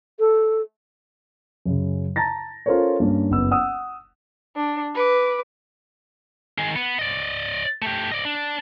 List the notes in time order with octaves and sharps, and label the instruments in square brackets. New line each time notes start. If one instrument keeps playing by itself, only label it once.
[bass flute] A4
[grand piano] F#2 C#3
A5 A#5 A6 A#6
C#4 F4 A4 A#4 C5 C#5
G2 A#3 C#4
F#1 B3 E6
F#5 D#6 E6
[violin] D4
B4 D6
[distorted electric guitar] D#3 G#4
B3
D5 D#5
A3 G4
D5 D#5
D4